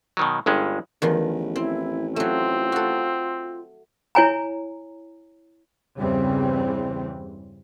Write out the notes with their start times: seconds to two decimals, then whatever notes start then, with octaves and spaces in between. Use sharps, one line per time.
0.17 B2 D#3 F#3
0.46 G1 G2 G#3 C#4
1.02 A1 E2 D#3 F3
1.56 C4 E4
2.16 F#3 A3 C4 F4
2.72 F#4 A4
4.15 E4 C#5 G#5 A#5
5.97 E2 G2 C#3 E3 G3 C4